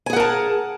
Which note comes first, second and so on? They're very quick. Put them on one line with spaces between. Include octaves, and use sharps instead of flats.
G#5 G#4 F#5 A#4 A5